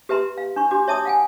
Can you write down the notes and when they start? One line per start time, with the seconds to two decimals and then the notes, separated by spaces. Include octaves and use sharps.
0.09 G4 B4 E5 A#5 C6
0.38 F5
0.56 D4 C#6
0.71 D4 F#4 G4 D6
0.88 C#5 E5 A5 D6 D#6
1.05 F5 F#5 G#5